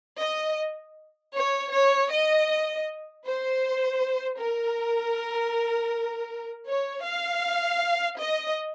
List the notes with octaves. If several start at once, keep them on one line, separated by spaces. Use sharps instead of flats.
D#5
C#5
C#5
D#5
C5
A#4
C#5
F5
D#5